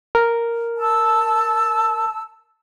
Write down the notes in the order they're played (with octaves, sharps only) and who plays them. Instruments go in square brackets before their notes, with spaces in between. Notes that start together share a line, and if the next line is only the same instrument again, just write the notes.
[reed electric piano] A#4
[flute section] A5 E6